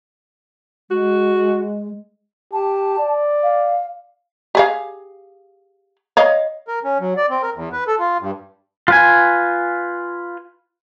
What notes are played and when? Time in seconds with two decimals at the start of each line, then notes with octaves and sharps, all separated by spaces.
0.91 G#3 F#4
2.53 G4 A5
2.98 D5
3.43 F5
4.55 G4 G#4 F5
6.17 C#5 D#5 F5
6.68 A#4
6.84 C#4
7.00 F#3
7.17 D5
7.29 C4
7.43 A#4
7.55 E2
7.72 B4
7.87 A4
7.99 F4
8.21 G2
8.88 F4 B4 G#5